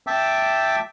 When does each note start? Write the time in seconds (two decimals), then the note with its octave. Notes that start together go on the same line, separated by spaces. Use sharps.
0.07 E5 G5 A5 D6 E6